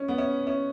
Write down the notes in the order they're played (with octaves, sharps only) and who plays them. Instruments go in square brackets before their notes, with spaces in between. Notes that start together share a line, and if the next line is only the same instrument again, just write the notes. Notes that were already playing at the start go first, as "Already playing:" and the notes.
Already playing: [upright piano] C#4
B3
C#4
C#4